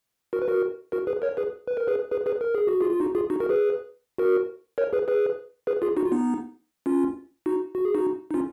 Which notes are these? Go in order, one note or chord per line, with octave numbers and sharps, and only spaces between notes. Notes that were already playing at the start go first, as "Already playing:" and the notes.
F#4 A#4
B4
F#4 A#4
F#4 A#4
G#4 B4
A#4 C#5
G#4 B4
B4
A#4
G#4 B4
G#4 B4
G#4 B4
A#4
G#4
F#4
F4 G#4
F4
D#4 F#4
F4 G#4
D#4 F#4
F#4 A#4
G#4 B4
F#4 A#4
A#4 C#5
G#4 B4
G#4 B4
G#4 B4
F4 G#4
D#4 F#4
F4
B3 D#4
C#4 F4
D#4 F#4
F#4
G#4
D#4 F#4
D#4
C#4 F4